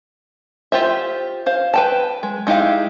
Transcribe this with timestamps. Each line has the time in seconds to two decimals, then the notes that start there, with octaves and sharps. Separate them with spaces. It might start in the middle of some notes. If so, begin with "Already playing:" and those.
0.72 F4 G4 C5 E5
1.46 C5 F5
1.74 B4 G5 A5
2.23 G#3
2.47 G#3 D#4 E4 G4 F5